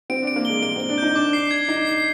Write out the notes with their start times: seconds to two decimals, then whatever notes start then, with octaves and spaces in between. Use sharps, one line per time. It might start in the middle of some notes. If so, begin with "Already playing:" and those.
0.10 C4 D7
0.23 D4 D7
0.36 A#3
0.45 G#3 G7
0.62 A#3 D7
0.76 C4 G7
0.89 D4
0.98 D#4 G6
1.15 D4 D6
1.33 C7
1.51 G#6
1.68 D#4 C7
1.86 C7